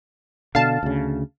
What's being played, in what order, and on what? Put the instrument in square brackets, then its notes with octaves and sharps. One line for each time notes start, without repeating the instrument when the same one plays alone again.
[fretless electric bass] B2 D3 [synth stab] F5 A5
[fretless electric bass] D2 C#3